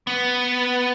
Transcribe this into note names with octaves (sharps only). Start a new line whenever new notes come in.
B3